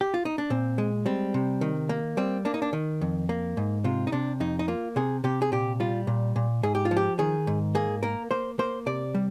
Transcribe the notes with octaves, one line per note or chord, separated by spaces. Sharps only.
G4
F4
D#4
D4
A#2 C4
G#3
G3 C4
C3
D#3
A#3
G3 C4
A#3 D4
D#4
D4
D#3
F2
A#3
G#2
C3 F4
D#4
C3 D4
F2 D#4
D#4
A#3 F4
C3 G#4
C3 G4
G#4
A#2 G4
G3 F4
A#2
A#2
G#2 G#4
G4
F4
F3
G4
D#3 G#4
G#2
A#3 G#4
A#3 A#4
A#3 C5
A#3 C5
C3 D5
G3